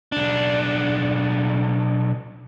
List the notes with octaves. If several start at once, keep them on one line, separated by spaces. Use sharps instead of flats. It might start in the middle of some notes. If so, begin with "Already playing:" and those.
B1 D4